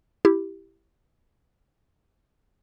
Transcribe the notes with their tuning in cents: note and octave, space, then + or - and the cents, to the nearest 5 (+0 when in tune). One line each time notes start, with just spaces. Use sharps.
E4 +5 G4 +0